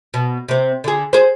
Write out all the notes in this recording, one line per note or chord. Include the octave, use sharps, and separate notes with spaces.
B2
C3 C4
D3 G#4
G#4 C5